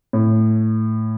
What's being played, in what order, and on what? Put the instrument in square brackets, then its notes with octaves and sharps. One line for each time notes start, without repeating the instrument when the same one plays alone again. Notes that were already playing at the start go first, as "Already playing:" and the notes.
[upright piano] A2